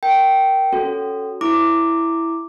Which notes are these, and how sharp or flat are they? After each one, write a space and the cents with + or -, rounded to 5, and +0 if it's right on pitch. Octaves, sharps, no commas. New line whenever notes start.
A#4 +0 G5 -15
C#4 +0 F#4 +0 A4 +0
E4 +0 D6 +0